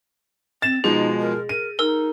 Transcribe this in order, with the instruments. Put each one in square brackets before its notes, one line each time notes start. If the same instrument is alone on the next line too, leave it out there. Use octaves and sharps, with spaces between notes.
[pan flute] C4 [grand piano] A6 E7
[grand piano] B2 F3 G#3 [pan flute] D#4 [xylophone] G#4
[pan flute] A#4
[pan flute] A#4 [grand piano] D#7
[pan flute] D#4 [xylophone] A#4 E6